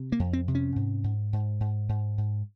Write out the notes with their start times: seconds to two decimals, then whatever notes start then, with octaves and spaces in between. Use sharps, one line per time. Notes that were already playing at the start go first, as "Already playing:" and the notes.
Already playing: C3
0.12 A#3
0.19 F2
0.33 C4
0.48 C3
0.55 C#4
0.76 G#2
1.04 G#2
1.33 G#2
1.60 G#2
1.89 G#2
2.18 G#2